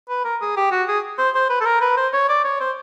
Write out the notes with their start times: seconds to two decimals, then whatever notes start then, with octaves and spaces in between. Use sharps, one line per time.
0.09 B4
0.24 A#4
0.41 G#4
0.57 G4
0.71 F#4
0.88 G#4
1.18 C5
1.35 C5
1.50 B4
1.61 A4
1.65 A#4
1.81 B4
1.97 C5
2.13 C#5
2.29 D5
2.45 C#5
2.60 C5